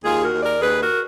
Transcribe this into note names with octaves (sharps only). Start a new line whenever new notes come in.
D#2 F4 G#4
F#4 A#4
D#2
A#4 D5
D#2 G#4 B4
F#4 A#4